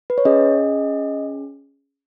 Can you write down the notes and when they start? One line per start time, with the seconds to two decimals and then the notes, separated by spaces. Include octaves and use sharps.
0.10 B4
0.18 C#5
0.25 C#4 G#4 D#5